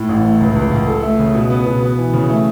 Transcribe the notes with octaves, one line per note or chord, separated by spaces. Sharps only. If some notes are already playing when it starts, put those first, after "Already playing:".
Already playing: A2
A1
A3
C#2
C#2
C#2
A4
A3
C#3
B2
B3
B2
B3
E3
C#3
A3